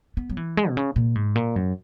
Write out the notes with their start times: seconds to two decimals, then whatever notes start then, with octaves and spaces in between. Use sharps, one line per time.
0.17 B3
0.30 F#3
0.37 E3
0.57 G#3
0.69 B2
0.77 C#3
0.96 A#2
1.15 G#2
1.35 A#2
1.56 F#2